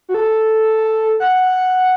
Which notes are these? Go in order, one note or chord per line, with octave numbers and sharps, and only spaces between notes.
F#4
A4
F#5